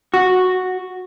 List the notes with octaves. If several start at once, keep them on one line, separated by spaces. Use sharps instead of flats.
F#4